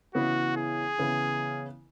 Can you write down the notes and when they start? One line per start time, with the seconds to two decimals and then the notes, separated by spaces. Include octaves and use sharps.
0.15 C#3 E3 B3 E4 F#4
0.57 G#4
0.98 C#3 E3 B3 E4